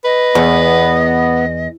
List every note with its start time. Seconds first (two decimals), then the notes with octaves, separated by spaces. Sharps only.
0.04 B4 D#5
0.35 E2 B3